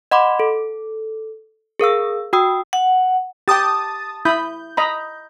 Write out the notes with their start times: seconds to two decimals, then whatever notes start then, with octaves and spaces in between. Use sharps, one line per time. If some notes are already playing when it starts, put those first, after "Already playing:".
0.11 D#5 F#5 B5 C6 D6
0.40 A4
1.79 G#4 A#4 F5 E6
2.33 F#4 G5 D#6 E6
2.73 F#5
3.48 G4 G5 A5 D#6 A6
4.25 E4 B5 D#6 G6
4.77 D#5 A#5 B5